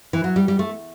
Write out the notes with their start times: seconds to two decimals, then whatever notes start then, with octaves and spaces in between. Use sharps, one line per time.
0.13 E3
0.24 F#3
0.36 G3
0.48 G3
0.59 A3